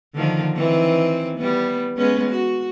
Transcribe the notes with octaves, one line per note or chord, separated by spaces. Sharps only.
D3 D#3 F3
D#3 E3 C4
G3 B3
G#3 B3 C#4
F#4